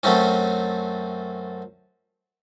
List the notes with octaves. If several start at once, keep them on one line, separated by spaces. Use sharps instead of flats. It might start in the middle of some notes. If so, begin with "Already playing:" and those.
F#2 F#3 A3 C4 C#4